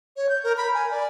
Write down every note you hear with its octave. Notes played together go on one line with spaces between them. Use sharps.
C#5
G6
A#4
B5
G#5
D5